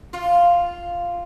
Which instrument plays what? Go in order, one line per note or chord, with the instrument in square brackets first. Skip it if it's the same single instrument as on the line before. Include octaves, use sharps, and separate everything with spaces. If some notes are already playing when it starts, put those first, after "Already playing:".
[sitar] F4